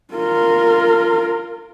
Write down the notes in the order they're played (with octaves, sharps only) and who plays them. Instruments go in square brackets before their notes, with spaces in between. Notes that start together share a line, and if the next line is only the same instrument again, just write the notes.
[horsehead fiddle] F4 A#4